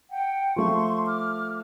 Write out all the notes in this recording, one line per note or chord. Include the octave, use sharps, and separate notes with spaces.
F#5 G5
F3 A3 C6 C#6
D6 F6